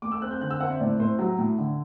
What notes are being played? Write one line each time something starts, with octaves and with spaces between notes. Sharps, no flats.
A3 D6
E6
C4 F#6
G6
D3 F#6
E6
C4 F#5
E5
A2 D5
A2 C5
F#3
A2
D3